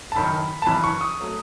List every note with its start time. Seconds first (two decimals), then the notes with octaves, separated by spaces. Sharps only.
0.12 A5
0.16 F#1 F#2 D#3 B5
0.62 A5
0.66 F#1 F#2 E3 B5
0.84 C#6
1.01 D#6
1.21 F#3 A3